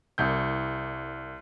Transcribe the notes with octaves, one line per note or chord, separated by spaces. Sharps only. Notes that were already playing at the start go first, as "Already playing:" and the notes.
C2 G6